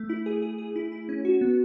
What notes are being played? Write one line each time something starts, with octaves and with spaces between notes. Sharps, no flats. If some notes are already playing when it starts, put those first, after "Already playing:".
Already playing: A3
E4
G#4
G#4
G#4
E4
E4
C#4
F#4
B3